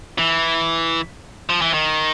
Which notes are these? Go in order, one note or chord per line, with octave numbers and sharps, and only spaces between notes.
E3
F3
E3
D#3